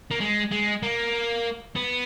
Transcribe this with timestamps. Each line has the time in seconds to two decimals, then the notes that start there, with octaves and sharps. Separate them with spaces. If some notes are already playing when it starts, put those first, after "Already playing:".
0.11 A#3
0.20 G#3
0.51 G#3
0.83 A#3
1.76 B3